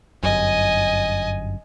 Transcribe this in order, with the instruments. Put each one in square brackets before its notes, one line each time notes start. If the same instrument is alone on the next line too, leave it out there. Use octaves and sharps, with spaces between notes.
[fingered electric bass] G1 F#2 [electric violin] D#5 G#5